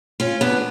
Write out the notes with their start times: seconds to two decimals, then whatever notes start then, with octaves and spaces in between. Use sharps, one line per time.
0.20 C#4 F4
0.41 B3 D4